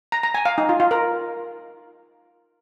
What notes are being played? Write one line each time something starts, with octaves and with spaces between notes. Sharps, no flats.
A#5
A#5
G#5
F5
D#4
F4
F4
A#4